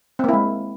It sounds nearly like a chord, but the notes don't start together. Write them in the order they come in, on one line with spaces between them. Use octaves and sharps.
C4 A#3 E4 G#3